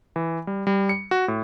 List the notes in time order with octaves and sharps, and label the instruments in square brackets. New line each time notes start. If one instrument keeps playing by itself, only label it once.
[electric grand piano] E3
G3
G3
C#7
F#4
A2